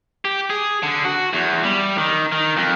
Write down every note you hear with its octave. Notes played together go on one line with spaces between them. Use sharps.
G4
G#4
D3
F#4
E2
G3
D#3
D#3
F2